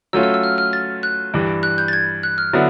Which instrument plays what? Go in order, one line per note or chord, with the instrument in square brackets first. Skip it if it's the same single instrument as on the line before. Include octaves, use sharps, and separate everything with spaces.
[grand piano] F#3 A3 C#4 F4 [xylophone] E6
[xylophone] E6
E6
F6
F6
A6
F#6
[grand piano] G2 E3 G3
[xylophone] F#6
G6
A6
G#6
F#6
F6
[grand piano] D3 F#3 B3 E4